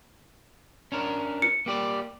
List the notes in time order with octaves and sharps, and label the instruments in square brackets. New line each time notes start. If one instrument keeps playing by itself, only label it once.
[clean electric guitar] C#4 D4 A#4
[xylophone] C#7
[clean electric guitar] A#3 G4 D5